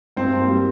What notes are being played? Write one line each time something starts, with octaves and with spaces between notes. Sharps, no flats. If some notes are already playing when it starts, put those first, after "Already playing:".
G2 C4 C5
G3 A#3